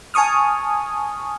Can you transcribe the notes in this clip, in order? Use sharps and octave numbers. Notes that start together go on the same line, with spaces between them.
G#5 A5 C#6 D#6 F6